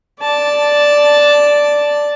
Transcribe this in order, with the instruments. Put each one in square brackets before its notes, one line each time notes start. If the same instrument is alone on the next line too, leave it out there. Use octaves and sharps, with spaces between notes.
[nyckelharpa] D5 A5